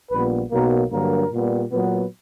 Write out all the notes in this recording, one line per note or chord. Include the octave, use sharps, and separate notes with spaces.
A#1 A#2 G3 B3 B4
B1 B2 F#3 A#3 A#4
G2 D3 F#3 A#3 A#4
A#2 G3 B3
A#2 F#3 B3